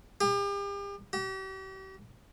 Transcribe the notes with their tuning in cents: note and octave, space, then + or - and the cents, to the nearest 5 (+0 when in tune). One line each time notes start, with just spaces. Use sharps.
G4 +40
G4 -40